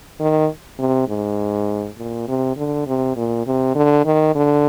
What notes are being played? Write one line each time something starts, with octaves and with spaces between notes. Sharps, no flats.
D#3
C3
G#2
A#2
C3
D3
C3
A#2
C3
D3
D#3
D3